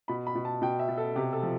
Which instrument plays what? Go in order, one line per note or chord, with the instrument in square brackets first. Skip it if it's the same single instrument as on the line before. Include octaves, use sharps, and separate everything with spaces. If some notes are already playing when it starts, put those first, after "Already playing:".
[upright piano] B2 B5
B5
B2
A5
B2 G5
E5
B2
A4
C3 G4
A4
F3